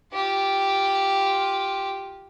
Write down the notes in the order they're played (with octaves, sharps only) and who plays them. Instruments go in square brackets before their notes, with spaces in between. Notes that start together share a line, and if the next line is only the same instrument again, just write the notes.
[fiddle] F4 G4